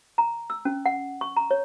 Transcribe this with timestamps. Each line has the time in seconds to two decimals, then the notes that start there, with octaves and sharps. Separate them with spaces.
0.18 A#5
0.50 E6
0.65 C#4
0.86 F#5
1.21 C#6
1.36 A#5
1.51 C#5